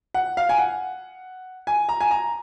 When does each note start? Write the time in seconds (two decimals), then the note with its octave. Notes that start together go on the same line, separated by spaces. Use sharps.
0.14 F#5
0.37 F5
0.49 G#5
0.58 F#5
1.67 G#5
1.89 A#5
2.01 G#5
2.11 A#5